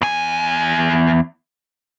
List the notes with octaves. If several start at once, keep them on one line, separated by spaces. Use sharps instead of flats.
E2 G#5